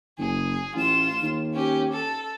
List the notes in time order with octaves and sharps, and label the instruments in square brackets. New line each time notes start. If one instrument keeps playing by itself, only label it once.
[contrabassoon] F#1 [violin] G#4
[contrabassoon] A1 [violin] F4 E7
[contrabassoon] D#2
[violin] C#4 G4
A4